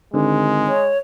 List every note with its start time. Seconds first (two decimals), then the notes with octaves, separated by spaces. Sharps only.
0.14 G#1 D3 G#3
0.68 C#5